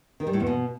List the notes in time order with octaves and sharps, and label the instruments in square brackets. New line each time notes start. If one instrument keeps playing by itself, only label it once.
[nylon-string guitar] D#3
G3
A2
E2
B2